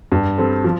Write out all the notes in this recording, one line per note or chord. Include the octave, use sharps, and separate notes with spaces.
G2
G3 C4 A4
F3